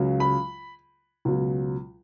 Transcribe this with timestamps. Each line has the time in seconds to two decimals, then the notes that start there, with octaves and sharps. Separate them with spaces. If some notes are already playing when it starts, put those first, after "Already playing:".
Already playing: C#2 C#3 F#3
0.20 B5
1.25 C#2 B2 F#3